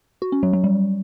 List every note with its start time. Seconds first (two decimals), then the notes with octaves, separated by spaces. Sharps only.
0.22 F#4
0.32 C#4
0.43 F#3
0.53 F#3
0.64 G3